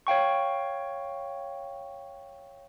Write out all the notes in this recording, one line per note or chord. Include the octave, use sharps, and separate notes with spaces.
C#5 F5 G5 C#6